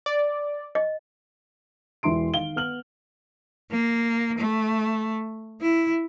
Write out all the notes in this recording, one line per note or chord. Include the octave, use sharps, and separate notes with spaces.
D5
D#5
E1 E3 E5 C6 D7
D#3 F5 G7
B3 F6 F#7
A#3
A3
E4